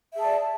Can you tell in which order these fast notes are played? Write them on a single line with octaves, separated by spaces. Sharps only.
E5 G#4 A5 D5